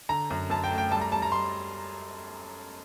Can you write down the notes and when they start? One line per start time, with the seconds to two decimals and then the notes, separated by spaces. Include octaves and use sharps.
0.09 D3 A#5
0.30 F#2
0.50 F#2 A5
0.64 G5
0.71 A3
0.78 G5
0.91 G3 A5
1.01 A#5
1.12 G3 A5
1.22 A#5
1.32 G3 C6